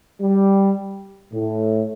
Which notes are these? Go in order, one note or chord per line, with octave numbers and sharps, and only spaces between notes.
G3
A2